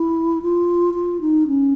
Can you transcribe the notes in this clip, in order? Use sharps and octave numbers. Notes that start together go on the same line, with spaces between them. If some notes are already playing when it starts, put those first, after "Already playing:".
Already playing: E4
F4
F4
D#4
C#4